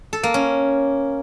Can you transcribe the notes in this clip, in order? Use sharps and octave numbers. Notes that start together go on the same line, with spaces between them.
A4
A#3
C#4